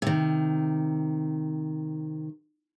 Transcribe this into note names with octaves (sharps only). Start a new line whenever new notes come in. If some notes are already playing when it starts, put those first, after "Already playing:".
C3 D#3